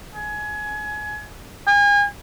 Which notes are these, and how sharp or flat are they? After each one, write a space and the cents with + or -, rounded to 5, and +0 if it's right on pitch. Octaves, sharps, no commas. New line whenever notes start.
G#5 +25
G#5 -35